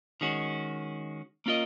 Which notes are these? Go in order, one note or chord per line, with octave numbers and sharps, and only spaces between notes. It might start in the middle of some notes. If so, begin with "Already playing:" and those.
D#3 G#3 C#4 F#4
A#3 C#4 F4 A#4 D#5